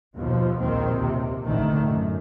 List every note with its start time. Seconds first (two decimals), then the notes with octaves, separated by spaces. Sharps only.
0.15 D#2 B2 F3
0.62 A#1 D#2 D#3 C4
0.96 D#2 C3
1.46 A1 A2 D3 D#3 A3
1.88 F#2